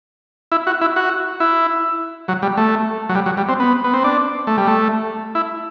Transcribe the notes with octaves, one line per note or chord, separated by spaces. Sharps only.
E4
F#4
E4
F#4
E4
F#3
G3
A3
F#3
G3
F#3
G3
C4
B3
B3
C4
D4
A3
G3
A3
E4